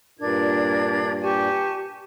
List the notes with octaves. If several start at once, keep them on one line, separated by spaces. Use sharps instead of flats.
G2 A#2 D4 A#4 G#6
G4 G#5 A5 C#6